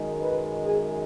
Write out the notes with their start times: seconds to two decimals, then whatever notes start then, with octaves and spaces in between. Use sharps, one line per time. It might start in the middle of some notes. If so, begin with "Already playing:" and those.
Already playing: F#2 D#3 G#3
0.21 B4
0.65 G#4